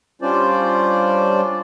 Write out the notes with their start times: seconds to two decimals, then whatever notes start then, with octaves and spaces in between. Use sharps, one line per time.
0.22 G3 C#4 D4 F4 C5 D5